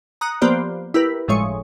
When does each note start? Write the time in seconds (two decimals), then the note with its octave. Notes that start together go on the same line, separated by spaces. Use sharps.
0.21 A#5 D#6 F#6 C#7
0.42 F3 A#3 B3 G4 C5 D5
0.94 E4 G4 A#4 B4
1.28 G1 A2 F3 G#3 C#5 C#6